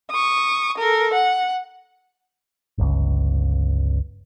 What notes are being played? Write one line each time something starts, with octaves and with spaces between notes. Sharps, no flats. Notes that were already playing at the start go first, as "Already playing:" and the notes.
C#6 D#6
A4 A#4
F#5
G1 C#2